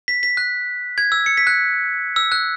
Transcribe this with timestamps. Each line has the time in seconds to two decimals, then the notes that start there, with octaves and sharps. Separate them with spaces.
0.08 B6
0.23 B6
0.37 F#6
0.98 G#6
1.12 E6
1.26 C#7
1.37 B6
1.47 F#6
2.16 E6
2.32 F#6